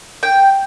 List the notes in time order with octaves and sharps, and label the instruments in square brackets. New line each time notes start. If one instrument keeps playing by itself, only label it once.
[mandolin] G5